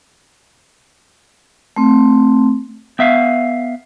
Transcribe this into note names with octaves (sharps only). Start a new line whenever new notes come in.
A3 C4
B3 E5 F5